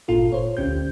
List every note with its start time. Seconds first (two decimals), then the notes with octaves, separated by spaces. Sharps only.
0.08 G1 A#2 F4 A4
0.32 C5 C#5
0.57 D2 C#4 G4 G6